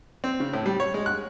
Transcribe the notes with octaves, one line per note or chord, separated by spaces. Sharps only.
C4
C#3
A2
G3
C#5
G#3
F#6